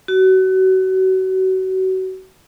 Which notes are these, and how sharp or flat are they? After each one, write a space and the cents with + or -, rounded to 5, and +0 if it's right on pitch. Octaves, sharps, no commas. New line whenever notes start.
F#4 +30